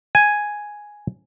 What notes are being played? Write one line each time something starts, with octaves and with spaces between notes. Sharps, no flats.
G#5